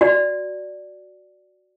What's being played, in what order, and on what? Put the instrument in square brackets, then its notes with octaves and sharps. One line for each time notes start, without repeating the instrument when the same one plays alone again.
[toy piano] F#4 D5